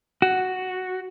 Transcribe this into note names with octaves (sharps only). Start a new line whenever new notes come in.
F#4